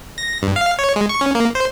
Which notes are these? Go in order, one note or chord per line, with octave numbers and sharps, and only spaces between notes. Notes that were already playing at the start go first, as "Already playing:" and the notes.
A#6
G2
F5
C#5
G#3
C#6
C#4
A#3
C5